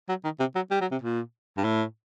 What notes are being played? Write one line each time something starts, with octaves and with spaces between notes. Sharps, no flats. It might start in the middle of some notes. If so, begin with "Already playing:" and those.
F#3
D#3
C3
F#3
G3
F#3
C3
A#2
G2
A2